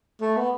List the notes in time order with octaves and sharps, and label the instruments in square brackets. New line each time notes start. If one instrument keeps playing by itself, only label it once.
[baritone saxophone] A3
B3